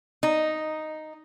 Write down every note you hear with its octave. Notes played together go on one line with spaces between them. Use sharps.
D#4